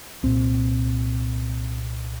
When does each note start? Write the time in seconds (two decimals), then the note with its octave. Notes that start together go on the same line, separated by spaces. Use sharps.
0.23 C2 A#2 C4